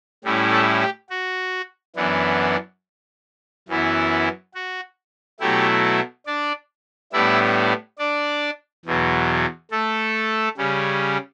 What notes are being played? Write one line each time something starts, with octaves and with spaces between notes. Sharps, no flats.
A2 G3 C#4 E4
A3 A4
G4
F#4
F#2 E3 B3 D4
F#2 E3 B3 E4
F#4
B2 F#3 A3 E4 G4
D4 D5
A2 G3 B3 D4 E4 E5
D4 D5
E2 B2 F#3
A3 A4
C#3 G3 C#4